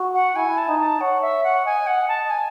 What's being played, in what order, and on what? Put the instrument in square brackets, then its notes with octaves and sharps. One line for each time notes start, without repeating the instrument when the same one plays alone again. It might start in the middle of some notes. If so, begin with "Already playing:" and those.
Already playing: [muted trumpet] F#4
[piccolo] F#5
[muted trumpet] E4 [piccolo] G#5
[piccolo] A5
[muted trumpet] D#4
[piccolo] A5
[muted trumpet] C#5 [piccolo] F#5
[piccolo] E5
F#5
[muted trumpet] D#5 [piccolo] G#5
[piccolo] F#5
A5
G#5